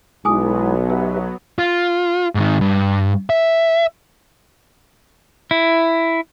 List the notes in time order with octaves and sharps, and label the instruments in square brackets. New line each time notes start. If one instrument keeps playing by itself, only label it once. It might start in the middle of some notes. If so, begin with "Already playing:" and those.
[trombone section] B1 [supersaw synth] F#3 B3 [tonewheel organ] G#3 E4 [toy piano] G#4 G#5 D#6
[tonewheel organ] G4 B4 E5
[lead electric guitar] F4
G#2 D#3
G2
E5
[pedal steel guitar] E4